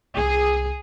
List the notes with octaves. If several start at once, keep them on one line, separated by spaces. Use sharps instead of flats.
C2 G#4